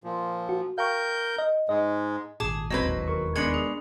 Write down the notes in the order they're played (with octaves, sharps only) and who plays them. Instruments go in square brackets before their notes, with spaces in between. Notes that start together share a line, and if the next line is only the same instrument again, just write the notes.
[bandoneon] A#2 F3
[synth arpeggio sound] F#4
[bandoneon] A#4 G6 [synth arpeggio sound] F5 G5 C#6
[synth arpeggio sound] D#5
[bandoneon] G#2 G#3 [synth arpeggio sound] D#5
[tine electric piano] G#1 A#2 [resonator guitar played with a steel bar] G#4 [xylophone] A5 D6 E7
[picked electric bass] E1 D#2 [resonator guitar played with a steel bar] F#3 C4 B4 [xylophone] D#5 G#6
[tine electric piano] A#4 C#6
[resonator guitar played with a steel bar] G#3 B3 D4 [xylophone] G#6 C#7 F#7
[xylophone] G#4